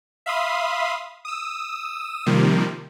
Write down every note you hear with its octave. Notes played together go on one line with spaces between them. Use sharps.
E5 F5 B5 C6 D#6
D#6 E6
C3 D#3 F3 G3 A#3